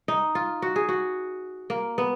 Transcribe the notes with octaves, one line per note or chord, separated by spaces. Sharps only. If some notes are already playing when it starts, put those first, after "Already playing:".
D#4
F4
F#4
G#4
F#4
A#3
B3